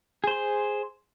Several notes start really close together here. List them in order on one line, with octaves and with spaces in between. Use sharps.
G#4 C5 C6